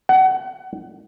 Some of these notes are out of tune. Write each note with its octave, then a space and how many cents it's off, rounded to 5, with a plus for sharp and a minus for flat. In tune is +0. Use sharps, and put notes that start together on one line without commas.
F#5 +25